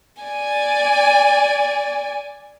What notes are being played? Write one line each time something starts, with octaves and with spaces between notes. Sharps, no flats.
D5 G#5